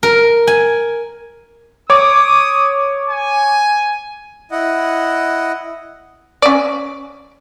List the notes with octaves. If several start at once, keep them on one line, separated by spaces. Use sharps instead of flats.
A#4
G#5
C#5 D6 D#6
G#5
E4 D#5 F#5
C#4 D5